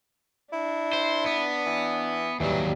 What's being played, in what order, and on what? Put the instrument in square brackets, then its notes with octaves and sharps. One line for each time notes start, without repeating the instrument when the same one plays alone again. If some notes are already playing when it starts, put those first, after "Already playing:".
[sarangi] D4 [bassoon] E4
[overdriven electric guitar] C5
B3
[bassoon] E3
[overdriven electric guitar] D#2 F#3 [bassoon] E3 [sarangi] G3